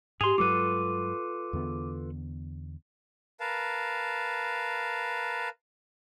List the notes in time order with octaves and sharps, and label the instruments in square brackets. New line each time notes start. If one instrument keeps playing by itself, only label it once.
[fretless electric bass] G#2 [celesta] G4 F7 [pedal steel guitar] G#4 C6
[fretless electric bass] G2 F#3 G#3 [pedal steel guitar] F4 A4 B4 [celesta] D6 D#7
[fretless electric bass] E2 D3 B3
[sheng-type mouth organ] A#4 B4 F5 A5